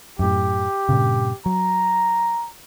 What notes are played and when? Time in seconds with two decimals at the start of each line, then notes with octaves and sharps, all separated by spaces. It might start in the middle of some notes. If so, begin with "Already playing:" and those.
0.19 F#2 A2 G4
0.89 G2 A#2 C#3
1.46 F#3 A#5